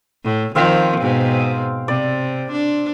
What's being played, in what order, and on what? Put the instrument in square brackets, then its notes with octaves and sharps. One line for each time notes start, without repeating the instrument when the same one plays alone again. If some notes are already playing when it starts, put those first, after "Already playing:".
[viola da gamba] A2
[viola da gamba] D#3 F3 [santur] C4 F5 G5
[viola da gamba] G#2 B2
[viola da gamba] C3 [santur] D5
[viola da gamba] D4